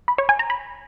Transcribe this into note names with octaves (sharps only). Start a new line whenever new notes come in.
B5
C#5
G#5
A#5
B5